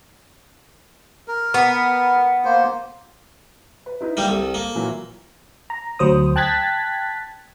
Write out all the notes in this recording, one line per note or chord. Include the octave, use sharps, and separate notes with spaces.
A#4
B3
A#3 C5
B4
D#4 E4 B4
G3 A#3 E5
C2 A4
A#3
A#2 E3 F#3
A#5
D2 F#3 C5 D#6
G5 A5 F#6 G#6 A6 B6